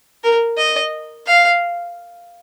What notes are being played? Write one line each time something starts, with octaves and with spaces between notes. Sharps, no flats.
A#4
D#5
F5